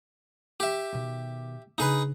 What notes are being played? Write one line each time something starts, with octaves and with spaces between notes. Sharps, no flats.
G4 E5
B2 D#3
C#3 D4 D#4 G#4 B4